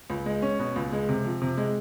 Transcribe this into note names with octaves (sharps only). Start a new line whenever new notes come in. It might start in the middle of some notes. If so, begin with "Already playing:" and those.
C#2
G#3
C#4
B2
C#2
G#3
C3
F3
C3
G#3